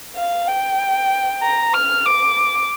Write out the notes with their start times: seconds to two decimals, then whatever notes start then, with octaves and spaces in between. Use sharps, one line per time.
0.16 F5
0.47 G5
1.42 A#5
1.74 F6
2.06 D6